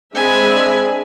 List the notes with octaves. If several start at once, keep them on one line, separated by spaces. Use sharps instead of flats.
G#3 C4 D4 G#4 E5 G#5 B5